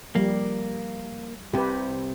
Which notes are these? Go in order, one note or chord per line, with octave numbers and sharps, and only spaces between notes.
F3 G3 A#3
C2 C3 G4 B4